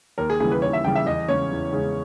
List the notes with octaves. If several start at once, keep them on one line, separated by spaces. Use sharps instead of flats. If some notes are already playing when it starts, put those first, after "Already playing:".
D#2 A#4
G#4
C#3 E3 G3 G#4
B4
D#2 C#5
E5
C#3 E3 G3 G5
E5
E2 D#5
C#3 G#3 C#4 C#5
E2
C#3 G#3 C#4